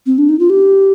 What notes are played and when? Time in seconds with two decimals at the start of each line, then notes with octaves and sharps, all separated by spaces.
0.06 C4
0.18 D4
0.29 D#4
0.39 F4
0.50 G4